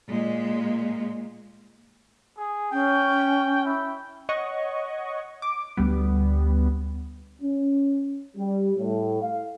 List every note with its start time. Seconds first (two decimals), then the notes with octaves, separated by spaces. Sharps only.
0.10 A#2 G#3
2.37 G#4
2.72 C#4 G5
3.65 E4
4.29 C#5 D#5 F#5 C#6
5.42 D6
5.77 D2 G3 B3
7.42 C#4
8.37 G3
8.77 A2
9.21 F5